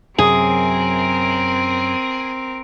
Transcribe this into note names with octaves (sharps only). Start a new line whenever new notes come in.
F#2 C3 F#3 C4 G#4 A#4